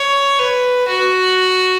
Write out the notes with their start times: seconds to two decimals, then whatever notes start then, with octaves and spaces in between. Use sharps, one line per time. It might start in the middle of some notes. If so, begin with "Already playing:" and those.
Already playing: C#5
0.39 B4
0.87 F#4